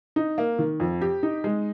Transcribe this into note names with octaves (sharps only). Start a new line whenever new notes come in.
D#4
A#3
D#3
F2
G4
D#4
G#3